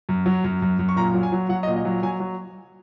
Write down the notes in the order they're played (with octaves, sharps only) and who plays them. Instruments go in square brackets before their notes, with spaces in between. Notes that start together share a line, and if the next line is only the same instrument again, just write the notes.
[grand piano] F#2
F#3
F#2
F#2
F#2
C#6
A#2 A#5
F#3
G#5
F#3
F#3 F#5
D#5
A#2
D#5
F#3
F#3 G#5
F#3